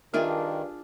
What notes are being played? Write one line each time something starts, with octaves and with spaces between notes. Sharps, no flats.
G2 D#3 D4 F4 G#4 A#4 E5